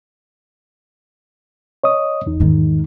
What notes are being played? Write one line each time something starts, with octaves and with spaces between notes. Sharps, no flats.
C#5 D#5 D#6
E2 D#4
G#2 D#3